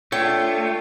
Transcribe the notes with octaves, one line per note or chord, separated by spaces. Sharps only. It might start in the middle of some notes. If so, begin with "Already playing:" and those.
A3 D4 F4 C#5 G5